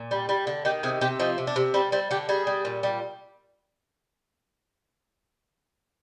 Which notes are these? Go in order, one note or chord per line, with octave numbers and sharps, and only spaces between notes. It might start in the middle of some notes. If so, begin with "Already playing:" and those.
Already playing: A#2
G3
G3
D3
D#3 G4
C3 G#4
C3 G4
F3 D#4
C3
D4
C3
G3 C4
G3 C4
D3 G4
G3 G#4
G3
A#2
G3